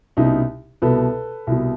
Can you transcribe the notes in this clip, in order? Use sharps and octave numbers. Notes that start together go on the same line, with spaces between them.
C2 B2 C#4 D#4
C2 B2 A4 B4
C2 B2